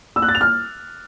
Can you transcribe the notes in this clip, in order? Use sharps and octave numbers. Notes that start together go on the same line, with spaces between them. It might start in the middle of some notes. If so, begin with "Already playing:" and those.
E6
F#6
A6
F7
F6